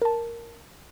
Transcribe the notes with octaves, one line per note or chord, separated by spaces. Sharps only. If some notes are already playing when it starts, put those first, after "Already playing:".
A#4 A5